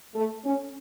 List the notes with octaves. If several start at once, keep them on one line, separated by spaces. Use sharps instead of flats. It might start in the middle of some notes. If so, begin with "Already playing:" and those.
A3
C#4